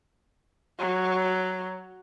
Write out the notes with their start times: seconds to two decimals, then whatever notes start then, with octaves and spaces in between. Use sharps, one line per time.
0.79 F#3